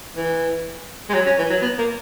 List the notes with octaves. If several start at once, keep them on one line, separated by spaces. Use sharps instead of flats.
E3
G#3
F#3
C#4
E3
F#3
B3
A#3